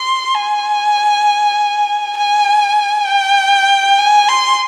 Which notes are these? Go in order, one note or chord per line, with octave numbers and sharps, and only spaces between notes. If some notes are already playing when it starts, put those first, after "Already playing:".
Already playing: C6
G#5
G#5
G5
G#5
C6